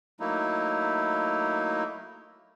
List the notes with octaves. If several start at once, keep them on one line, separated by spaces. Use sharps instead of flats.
F#3 A3 A#3 D#4 E4